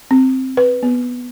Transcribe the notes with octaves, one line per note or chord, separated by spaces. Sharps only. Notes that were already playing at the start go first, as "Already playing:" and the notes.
C4
B4
B3